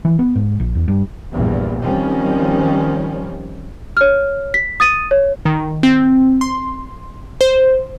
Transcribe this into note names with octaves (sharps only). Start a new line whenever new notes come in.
E3
B3
G#2
A#1
E2
G2
A#1 E2 G2
D#3 F3 G3 C4 C#4
C#5 F6
B6
D#6 A6 D#7
C#5
D#3
C4
C6
C5